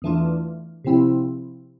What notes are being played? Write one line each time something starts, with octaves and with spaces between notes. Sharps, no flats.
E2 E3 A3 D4 F4
C3 F3 C4 E4